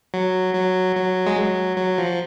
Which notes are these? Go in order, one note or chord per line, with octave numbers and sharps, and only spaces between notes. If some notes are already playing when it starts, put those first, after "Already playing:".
F#3
F#3
F#3
G#3
F#3
F#3
F3